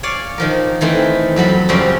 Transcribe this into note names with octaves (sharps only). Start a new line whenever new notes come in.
C#5 D5 F5 G#5
D#3 F3 A#4
D#3 E3 A3 C4
F2 F#3 A4 B5
F#2 C#3 F3 G3 C4 C#4